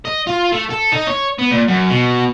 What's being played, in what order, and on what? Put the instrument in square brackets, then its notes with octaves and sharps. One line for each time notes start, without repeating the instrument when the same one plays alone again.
[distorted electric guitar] D#5
F4
A3
A4
D#4
C#5
B3
A#2
F#2
B2